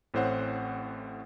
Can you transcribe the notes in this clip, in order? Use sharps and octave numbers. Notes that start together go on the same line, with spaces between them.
A1 A2 C4 C5 C#5 F#5